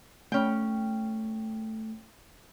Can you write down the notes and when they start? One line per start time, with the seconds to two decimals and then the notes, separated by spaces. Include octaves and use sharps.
0.32 A3 C#4 G5